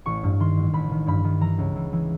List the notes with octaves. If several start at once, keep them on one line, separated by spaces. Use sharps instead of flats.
A1 C#6
G2
D#3 C6
A1
A1 B5
D#3
G2 B5
D#3
E3 A#5
C#2
E3
E3